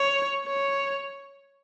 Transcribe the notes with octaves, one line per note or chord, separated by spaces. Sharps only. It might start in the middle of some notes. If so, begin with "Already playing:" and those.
Already playing: C#5
C#5